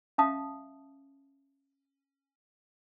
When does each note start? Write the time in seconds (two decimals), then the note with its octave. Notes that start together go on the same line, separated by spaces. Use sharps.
0.18 C#4 E5 F5 A5 D#6